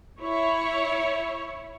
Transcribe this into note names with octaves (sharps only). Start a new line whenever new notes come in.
E4 C#5